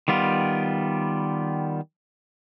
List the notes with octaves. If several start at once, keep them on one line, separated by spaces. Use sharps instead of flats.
D#3 G3 B3 F4